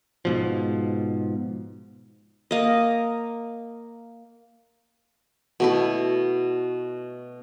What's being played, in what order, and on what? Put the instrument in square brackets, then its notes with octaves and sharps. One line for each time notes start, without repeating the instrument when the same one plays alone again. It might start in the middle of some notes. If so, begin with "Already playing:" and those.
[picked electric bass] G#2 B2 F3
[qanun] A#3 D#5
B2 A3 E4